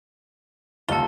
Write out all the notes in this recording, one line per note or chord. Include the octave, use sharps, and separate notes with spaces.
D#1 C2 F4 A4 A5 A#5 G7